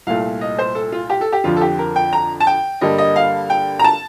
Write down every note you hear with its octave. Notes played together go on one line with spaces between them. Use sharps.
C2 A#2 A3 F5
D#5
C5
A4
F4
G4
A4
G4
F2 D3 F3 F4
A4
G4
A#4
G5
A#5
A5
G5
G2 D3 G3 A#3 D#5
D#5
F5
G5
A#5
A5